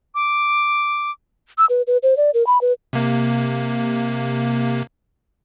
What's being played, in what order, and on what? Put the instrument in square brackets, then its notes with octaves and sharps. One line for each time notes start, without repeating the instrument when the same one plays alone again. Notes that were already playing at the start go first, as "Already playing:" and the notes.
[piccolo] D6
[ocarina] E6
B4
B4
C5
D5
A#4
B5
B4
[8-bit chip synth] C3 A#3